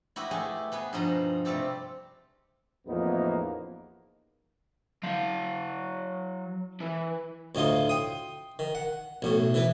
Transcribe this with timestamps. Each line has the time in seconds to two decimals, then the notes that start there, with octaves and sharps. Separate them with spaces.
0.16 E4 F#4 G4 B4 D#5
0.31 A3 G4 G#4 D#5 G#5
0.72 B3 G#4 B4
0.93 G2 B2 F3 D#4 A#5
1.45 C3 G3 A3 G4 A4
2.87 A1 E2 F3 A#3 B3 D#4
5.03 F#3 F5
6.80 E3
7.55 D2 A2 D#4 F4 C6
7.89 G5 C6 D#6
8.59 D#3
8.75 F#5
9.22 B1 A2 A3
9.54 E3 E4 B4